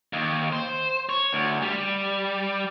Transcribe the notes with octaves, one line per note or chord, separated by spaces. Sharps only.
D#2
C5
C#5
D2
G3